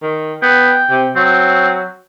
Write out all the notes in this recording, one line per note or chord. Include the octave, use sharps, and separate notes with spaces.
D#3
B3 G5
C3
F#3 C4